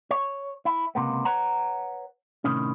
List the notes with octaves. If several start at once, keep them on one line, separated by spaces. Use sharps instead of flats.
C#5
E4
C#2 G2 C3 A#3 B3
B4 C#5 F#5 A#5
A2 C3 D#3 C#4